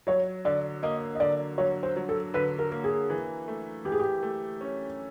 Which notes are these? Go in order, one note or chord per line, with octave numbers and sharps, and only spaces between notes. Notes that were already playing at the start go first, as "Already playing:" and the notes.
F#3 C#5
D3 D5
A#3 D#5
D#5
D3 D5
F#3 C#5
C5
F#3
A4
D3 B4
A#4
A#3
G#4
E3
A3
E3 G4
G#4
G4
A3
C#4